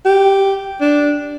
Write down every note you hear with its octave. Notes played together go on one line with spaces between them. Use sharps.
G4
D4